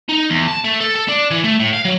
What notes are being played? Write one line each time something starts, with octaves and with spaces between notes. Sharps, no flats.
D#4
E2
A5
A3
A4
A4
D4
E3
A3
A2
F5
F#3